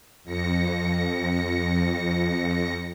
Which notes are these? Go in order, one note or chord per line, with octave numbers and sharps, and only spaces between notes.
F2 A#6 C#7